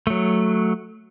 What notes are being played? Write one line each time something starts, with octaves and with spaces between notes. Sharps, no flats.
F#3 A3